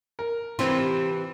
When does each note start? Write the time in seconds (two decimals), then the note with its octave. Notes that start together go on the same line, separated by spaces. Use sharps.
0.19 A#4
0.59 C3 E3 C4 F4 C6